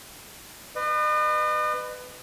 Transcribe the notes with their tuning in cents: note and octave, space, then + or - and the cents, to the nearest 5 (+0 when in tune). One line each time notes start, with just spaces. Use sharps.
B4 +20 D#5 -40